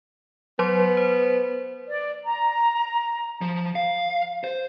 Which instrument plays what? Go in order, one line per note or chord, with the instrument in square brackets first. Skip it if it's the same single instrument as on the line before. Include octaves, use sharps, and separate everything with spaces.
[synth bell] F#3 C5 C6 [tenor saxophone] B3
[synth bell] C5
[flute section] D5
A#5
[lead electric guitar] F3
F5
C5